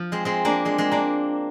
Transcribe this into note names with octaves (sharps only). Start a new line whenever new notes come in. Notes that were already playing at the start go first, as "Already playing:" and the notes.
Already playing: F3
G#3 C4
G#3 C4
A#3 D4
G#3 C4
G#3 C4
A#3 D4